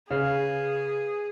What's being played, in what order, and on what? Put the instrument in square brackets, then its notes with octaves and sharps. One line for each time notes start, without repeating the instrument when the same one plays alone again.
[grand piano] C#3 [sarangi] G#4 [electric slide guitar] B4 F5